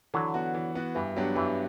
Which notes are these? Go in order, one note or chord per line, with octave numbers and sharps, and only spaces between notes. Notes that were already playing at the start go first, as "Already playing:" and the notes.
D3 E3 F#3
B3 F#4
E3
B3 F#4
G2 E3
F#3 B3 D4 G4
G2 E3